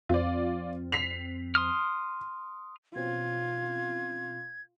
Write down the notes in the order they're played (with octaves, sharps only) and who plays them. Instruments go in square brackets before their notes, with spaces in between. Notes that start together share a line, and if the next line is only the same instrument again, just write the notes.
[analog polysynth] F2 C4 [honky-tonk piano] F4 D5
[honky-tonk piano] B6 C7 F7
[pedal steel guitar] C6 D#6 F6
[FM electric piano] B2 C4 C#4 [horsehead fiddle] F4 [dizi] G#6